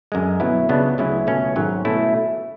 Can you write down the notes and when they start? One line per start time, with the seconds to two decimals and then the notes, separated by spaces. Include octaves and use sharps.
0.12 F#2 D3 G#3
0.40 B2 F#3 B3 E4
0.69 C#2 C#3 G#3 B3 D4
0.98 D2 C#3 F#3 C#4 E4
1.27 C#2 B2 A3 C#4
1.56 G#1 G#2 F#3 C#4
1.85 B2 A3 C#4 E4